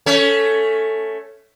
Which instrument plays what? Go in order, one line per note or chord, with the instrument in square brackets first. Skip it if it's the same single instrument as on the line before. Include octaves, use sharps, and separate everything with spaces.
[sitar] A3 C#4